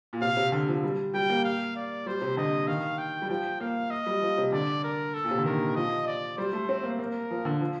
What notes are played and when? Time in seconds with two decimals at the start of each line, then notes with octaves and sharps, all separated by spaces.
0.13 A#2
0.21 C3 F5
0.37 C3
0.52 D3
0.68 F3
0.83 G3
1.14 G3 G5
1.30 A#3
1.45 F5
1.76 D5
2.06 G3 C5
2.22 C3
2.37 D3 D#5
2.68 D#3 F5
2.98 G5
3.22 G3
3.29 F3 G5
3.60 A#3 F5
3.91 D#5
4.06 G3
4.22 F3
4.38 C3
4.52 D3 D5
4.84 A#4
5.14 A4
5.24 A#2
5.31 C3
5.38 D3
5.45 D#3 A#4
5.75 F3 D#5
6.07 D5
6.38 G3 C5
6.53 A3
6.69 C4
6.83 A#3
6.99 A#3 A#4
7.31 F3
7.45 D3
7.61 F3